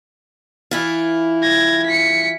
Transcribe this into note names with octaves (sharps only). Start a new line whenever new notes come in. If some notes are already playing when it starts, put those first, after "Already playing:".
E3 E4 F4
G#6 A#6
B6 C#7